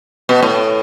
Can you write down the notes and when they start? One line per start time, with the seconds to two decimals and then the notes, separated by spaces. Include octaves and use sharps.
0.29 B2
0.42 A2